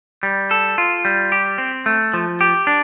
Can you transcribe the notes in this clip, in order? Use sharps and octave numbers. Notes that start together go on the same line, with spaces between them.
G3
A4
F4
G3
G4
C4
A3
F3
G4
D4